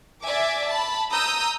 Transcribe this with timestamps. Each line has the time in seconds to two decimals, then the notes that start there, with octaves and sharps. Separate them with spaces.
0.24 D5 E5 G#5 D6
0.69 A5 B5
1.12 A#5 D#6 E6 G6